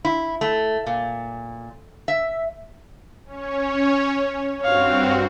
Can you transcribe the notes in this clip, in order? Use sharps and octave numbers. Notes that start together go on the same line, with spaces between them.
E4
A3
A#2
E5
C#4 C#5
G2 C4 F#4 C#5 F5